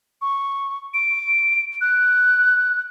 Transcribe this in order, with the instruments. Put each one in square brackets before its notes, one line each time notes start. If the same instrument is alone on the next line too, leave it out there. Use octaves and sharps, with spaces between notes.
[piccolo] C#6
D7
F#6